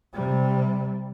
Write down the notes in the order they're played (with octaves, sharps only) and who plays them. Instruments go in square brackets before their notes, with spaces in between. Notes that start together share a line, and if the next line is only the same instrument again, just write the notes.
[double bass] C3 G3